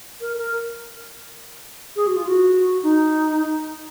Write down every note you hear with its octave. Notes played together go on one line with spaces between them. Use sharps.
A#4
A#4
G#4
F#4
F4
F#4
D#4